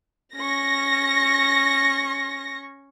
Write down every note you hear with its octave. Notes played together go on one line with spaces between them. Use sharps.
C#4 C#6 A#6